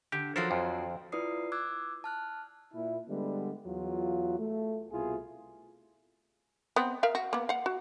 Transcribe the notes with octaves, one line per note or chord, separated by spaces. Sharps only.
D3 G4
F3 F#3 A4 A#4 C5
F2
E4 F4 B4 D5 D#6 C7
D6 E6 F#6 G#6
A5 F6 F#6
A#2 E4
D3 G3 G#3 B3
E2 F#3 F4
A3
C2 B2 E4 F4 G#4
B3 C4
A#4 E5 F5
F#4
A#3 B3
F5 F#5
F#4